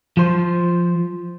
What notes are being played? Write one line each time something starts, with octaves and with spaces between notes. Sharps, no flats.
F3 C5